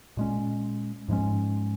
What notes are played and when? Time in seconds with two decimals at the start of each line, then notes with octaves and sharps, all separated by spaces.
0.17 A#2 G#3 C#4
1.08 G#2 F3 G#3 C#4